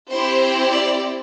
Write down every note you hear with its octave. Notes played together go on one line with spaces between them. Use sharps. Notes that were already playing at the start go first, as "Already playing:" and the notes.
C4 E4 G4 C5
D5